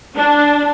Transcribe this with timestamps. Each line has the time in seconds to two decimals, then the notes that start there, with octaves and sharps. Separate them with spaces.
0.16 D4